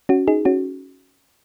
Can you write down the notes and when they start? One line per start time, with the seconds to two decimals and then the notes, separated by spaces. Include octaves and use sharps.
0.09 C#4 F#4
0.28 D#4 G#4
0.45 C#4 F#4